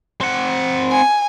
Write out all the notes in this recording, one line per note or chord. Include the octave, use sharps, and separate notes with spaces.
C4 F#5
G#5